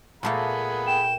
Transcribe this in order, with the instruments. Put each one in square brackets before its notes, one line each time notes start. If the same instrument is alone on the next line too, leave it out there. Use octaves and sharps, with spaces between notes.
[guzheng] A#2 A3 A#3 [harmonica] G#4 F#5 B5
[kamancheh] G5 [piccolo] E7